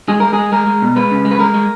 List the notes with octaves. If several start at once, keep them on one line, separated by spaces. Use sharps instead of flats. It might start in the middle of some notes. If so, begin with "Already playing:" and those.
G#3 G#4
G#3 A#4
G#4
G#3
G#3 A#4
G#3
B2
G#3 B4
C#3
G#3
B4
G#3 A#4
G#3